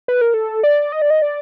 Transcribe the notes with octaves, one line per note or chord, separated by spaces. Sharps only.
B4
A#4
A4
D5
D#5
D5
D#5
D5